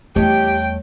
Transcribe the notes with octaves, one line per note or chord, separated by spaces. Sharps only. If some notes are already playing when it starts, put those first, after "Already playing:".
E2 G3 A3 G4 C#5 D#5 G5